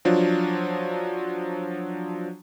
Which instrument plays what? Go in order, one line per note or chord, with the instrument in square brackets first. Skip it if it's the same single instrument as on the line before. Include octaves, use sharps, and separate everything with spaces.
[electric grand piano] F3 F#3 D4 F4